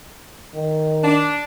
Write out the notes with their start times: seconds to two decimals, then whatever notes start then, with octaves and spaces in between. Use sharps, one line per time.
0.54 D#3
1.04 D4